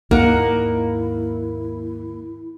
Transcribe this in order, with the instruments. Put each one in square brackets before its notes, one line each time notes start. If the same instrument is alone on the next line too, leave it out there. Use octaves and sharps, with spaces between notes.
[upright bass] D#2 G#2 [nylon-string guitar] A#3 [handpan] D#4 A#4 F#5 [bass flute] E4